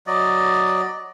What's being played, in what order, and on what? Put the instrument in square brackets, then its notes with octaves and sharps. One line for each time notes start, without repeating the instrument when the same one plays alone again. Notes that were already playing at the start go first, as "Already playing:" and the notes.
[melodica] F#3 D5 D#5